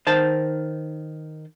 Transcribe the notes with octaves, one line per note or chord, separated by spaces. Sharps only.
D#3 C5 A5